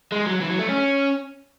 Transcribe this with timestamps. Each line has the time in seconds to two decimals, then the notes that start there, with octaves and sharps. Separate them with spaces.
0.12 G#3
0.26 F#3
0.41 E3
0.51 F#3
0.59 A3
0.69 C#4